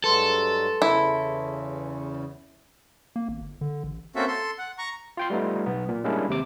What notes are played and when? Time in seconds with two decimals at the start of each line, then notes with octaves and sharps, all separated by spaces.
0.04 G2 F#3 G#3 A4 B4 C6
0.82 E2 C#3 E4
3.16 A#3
3.28 G#1
3.41 G1
3.61 D3
3.84 A1
4.16 A#3 C4 C#4 F#4 A4 E5
4.28 A4 C6
4.58 F#5
4.78 A#5 C#6
5.17 F4 G5 C6
5.30 G3 A3 B3 D#4 F4
5.66 B1 B3
5.89 A#2
6.04 G3 G#3 A#3 C#4 D4 E4
6.29 D#2 C3 D6